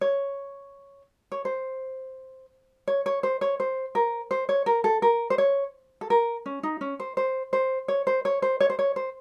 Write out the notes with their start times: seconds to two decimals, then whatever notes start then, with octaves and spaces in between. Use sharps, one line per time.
0.01 C#5
1.32 C#5
1.45 C5
2.88 C#5
3.06 C#5
3.23 C5
3.41 C#5
3.60 C5
3.95 A#4
4.31 C5
4.49 C#5
4.66 A#4
4.84 A4
5.02 A#4
5.30 C5
5.38 C#5
6.01 A4
6.10 A#4
6.46 C#4
6.63 D#4
6.81 C#4
7.00 C5
7.17 C5
7.53 C5
7.88 C#5
8.07 C5
8.25 C#5
8.42 C5
8.60 C#5
8.70 C5
8.79 C#5
8.96 C5